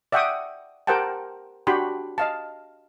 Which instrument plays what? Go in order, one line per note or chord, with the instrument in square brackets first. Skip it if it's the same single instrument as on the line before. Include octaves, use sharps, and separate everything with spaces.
[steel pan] D5 E5 F#5 G5 C#6 D#6
G4 A#4 C5 F#5 G5 A5
D4 F#4 G4 B5 C6
D#5 F5 A5